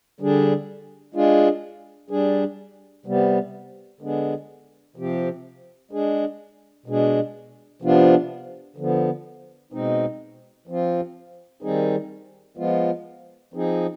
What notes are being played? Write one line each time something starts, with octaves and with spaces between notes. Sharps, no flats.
D3 G3 D4 G#4
G#3 D4 F4 G#4
G3 D4 G#4
C3 G3 B3
D3 G#3 B3 D4 G#4
C3 F3 C4 G4
G#3 D4 G#4
B2 G#3 D4 G#4
C3 F3 B3 D4 F4
D3 F3 B3
B2 G#3 C4 D#4
F3 C4 F4
D#3 G3 C4 D#4 G#4
F3 G#3 B3 F4
F3 C4 D#4 G#4